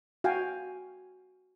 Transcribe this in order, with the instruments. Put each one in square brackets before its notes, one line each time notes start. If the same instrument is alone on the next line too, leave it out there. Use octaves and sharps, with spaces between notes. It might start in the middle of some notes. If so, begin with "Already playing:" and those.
[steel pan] F#4 F5 G5 G#5